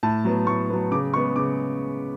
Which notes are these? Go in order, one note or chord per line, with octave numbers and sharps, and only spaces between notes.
A2 A5
F#3 B3
A2 C#6
F#3 B3
C#3 D6
G#3 B3 C#6
C#3 D6